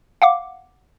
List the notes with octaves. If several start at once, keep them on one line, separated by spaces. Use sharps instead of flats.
F5 F#5 D6